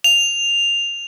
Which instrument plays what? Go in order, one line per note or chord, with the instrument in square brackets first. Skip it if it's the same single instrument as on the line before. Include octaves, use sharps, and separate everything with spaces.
[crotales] F7